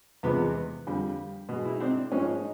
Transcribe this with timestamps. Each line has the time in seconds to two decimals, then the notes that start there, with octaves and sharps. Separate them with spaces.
0.23 E2 C3 F3 G#3 B3
0.87 F2 D3 G3
1.49 B2 G#3
1.65 E4
1.73 D#4
1.80 C4 D4
2.12 G#2 F3 G#3 C#4 D#4
2.33 D#4